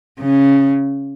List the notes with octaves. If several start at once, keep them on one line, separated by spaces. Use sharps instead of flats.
C#3